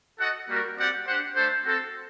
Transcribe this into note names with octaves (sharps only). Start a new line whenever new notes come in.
F#4 A4 D#5 F#5
G3 A#3 F#4 A#4
G3 C4 G4 D5 F#5
D4 G4 C5 F#5
A3 D4 A4 C5
C4 F#4 A4 C5